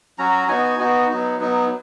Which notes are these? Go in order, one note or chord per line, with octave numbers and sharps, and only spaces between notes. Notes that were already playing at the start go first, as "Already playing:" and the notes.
F#3 C#4 F#4 A#5
B3 D#4 F#4 G#5
B3 D#4 F#4
F#3 B3 D#4
F#3 B3 D#4